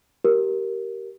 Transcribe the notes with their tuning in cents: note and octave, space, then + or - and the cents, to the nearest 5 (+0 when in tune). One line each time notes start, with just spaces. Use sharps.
G4 -20 A#4 +0